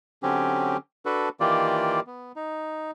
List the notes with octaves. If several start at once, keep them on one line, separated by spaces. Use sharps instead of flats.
D3 F#3 C4 C#4 G4
D4 F#4 A4 B4
D#3 E3 A#3 F4 G4 D5
B3
D#4